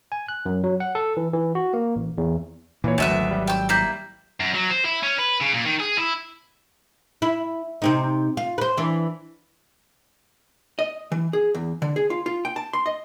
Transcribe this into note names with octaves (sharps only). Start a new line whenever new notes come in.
G#5
F#6
F#2
F#3
F#5
A4
E3
E3
F#4
A#3
A1
E2
A#2 E3 A#3 C#5
G#1 D2 F#3 B3 E5 F#6 D#7
G3
G5 E6
A#3 E4 G6
F#2
F#3
C5
E4
C#4
B4
C#3
A#2
D#3
G#4
E4
E4
C3 C4 D#4
F4
B4 C5
E3 D4
D#5
E3
G#4
E2
D3
G#4
F4
F4
G5
A5
C6
D#5